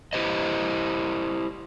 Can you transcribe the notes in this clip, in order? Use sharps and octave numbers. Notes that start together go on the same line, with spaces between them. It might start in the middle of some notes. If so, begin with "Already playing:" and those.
E4 G4 C5 D#5